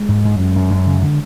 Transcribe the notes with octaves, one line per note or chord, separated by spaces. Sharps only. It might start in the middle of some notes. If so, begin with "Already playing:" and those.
Already playing: G#3
G#2
G#2
F#2
F#2
F#2
C#3
D3